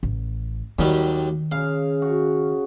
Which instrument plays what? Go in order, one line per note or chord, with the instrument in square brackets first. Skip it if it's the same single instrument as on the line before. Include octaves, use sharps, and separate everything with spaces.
[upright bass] A1
[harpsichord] D#2 F#3 G3 [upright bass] D#3
[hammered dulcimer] C#3 [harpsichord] F5
[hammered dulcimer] F#4